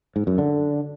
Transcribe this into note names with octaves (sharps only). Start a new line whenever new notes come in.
G#2
F#2
D3